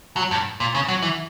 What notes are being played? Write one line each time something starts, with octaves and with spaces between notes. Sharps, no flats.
F#3
G2
A#2
C#3
F#3
E3